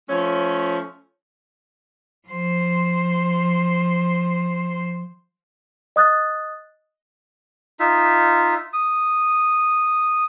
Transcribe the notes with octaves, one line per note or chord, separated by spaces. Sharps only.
F3 A3 C#4
F3 C5
D#5 D#6 F#6 A6
D#4 F4 E5
D#6